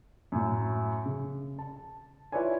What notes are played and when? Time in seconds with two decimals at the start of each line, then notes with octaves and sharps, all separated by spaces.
0.32 F#2 A2
1.06 C#3
1.59 A5
2.32 E4 F4 B4 C#5 D5 G#5